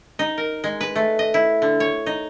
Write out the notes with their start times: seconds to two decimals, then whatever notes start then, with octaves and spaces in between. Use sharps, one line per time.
0.19 D#4
0.38 A#4
0.64 G#3
0.81 B4
0.96 A3
1.19 D#5
1.34 E4
1.62 D3
1.80 C#5
2.06 D#4